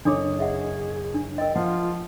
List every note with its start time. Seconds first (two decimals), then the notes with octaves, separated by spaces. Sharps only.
0.05 F#1 C#4 D4 A4 C#5 D6
0.38 G#4 D#5 E5 F#5
1.14 D4
1.38 A#4 D#5 G5
1.56 F3 F4 F#5